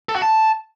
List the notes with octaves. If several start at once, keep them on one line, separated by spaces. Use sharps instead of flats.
A4
F#4
A5